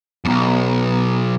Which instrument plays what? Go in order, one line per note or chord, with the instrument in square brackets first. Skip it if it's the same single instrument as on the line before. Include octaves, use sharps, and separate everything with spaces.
[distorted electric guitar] B1 F2 [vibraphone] B3 A#5